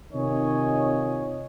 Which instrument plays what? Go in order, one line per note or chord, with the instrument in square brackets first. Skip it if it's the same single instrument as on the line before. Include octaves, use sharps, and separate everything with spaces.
[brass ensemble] C3 D#3 F4 C#5 D#5 G#5